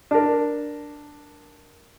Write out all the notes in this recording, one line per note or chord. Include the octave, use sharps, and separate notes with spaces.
D4 A#4